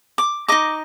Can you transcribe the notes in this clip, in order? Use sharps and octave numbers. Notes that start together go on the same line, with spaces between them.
D6
D#4 A#4 D#5 D6